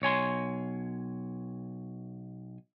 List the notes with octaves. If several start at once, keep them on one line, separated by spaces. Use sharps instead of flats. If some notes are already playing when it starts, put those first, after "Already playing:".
B1 C#5 G#5 C6